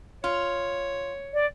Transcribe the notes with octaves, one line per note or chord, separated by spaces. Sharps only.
F4 C#5
D5